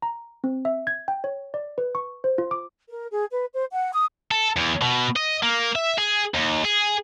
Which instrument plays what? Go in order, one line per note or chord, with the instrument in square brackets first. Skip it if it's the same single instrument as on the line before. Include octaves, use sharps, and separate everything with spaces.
[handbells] A#5
C4
E5
G#6
G5
C#5
D5
B4
C#6
C5
F4
D6
[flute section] A#4
G#4
B4
C5
F#5
D#6
[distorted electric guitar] A4
E2
B2
D#5
A#3
E5
G#4
D#2
G#4